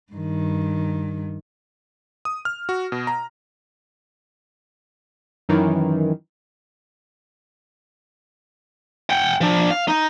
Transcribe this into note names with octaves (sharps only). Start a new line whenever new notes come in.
G2 D#3
D#6
F6
F#4
B2
A#5
F#2 D#3 E3
F#5 G5
F3 D4
F5
D#4